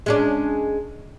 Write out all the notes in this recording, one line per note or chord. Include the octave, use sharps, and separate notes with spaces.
G#3 C#4 D4